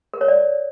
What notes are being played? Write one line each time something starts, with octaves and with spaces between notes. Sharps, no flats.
A#4
C#5
D5